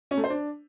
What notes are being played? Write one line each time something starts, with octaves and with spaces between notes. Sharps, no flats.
C#4
A3
C5
D4